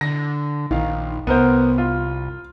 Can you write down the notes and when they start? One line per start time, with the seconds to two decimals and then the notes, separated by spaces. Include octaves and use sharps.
0.01 D3 A#6
0.71 A#1 D#3 F5
1.27 C2 B3 A#4 C5
1.78 F4